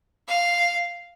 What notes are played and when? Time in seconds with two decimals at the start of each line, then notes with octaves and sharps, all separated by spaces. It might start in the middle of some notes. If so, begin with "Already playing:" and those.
0.28 F5